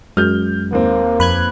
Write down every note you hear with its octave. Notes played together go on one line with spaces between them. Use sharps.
F#2 G#3 F6 G6
D#2 A#3 C4
F2 B4 F#6 G#6